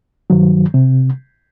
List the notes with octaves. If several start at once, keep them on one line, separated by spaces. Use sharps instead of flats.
G2 D#3 F#3
C3